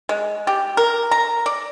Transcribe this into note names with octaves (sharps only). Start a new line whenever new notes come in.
G#3
G4
A#4
A#5
D5